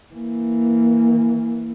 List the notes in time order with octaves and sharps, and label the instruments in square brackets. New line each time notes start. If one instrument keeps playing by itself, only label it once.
[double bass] E3 A#3